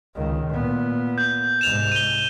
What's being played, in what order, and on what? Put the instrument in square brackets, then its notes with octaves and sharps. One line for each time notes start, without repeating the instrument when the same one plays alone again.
[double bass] C#2 D#3
A#2 B3
[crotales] G6
[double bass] C2 G#2 [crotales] E7 F7
[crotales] D#7 G7